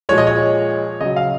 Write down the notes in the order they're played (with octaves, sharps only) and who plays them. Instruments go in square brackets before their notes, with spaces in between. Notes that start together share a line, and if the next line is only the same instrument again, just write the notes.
[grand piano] A#2 F3 G#3 C#5
D#5
C#5
C#3 F#3 D#5
F5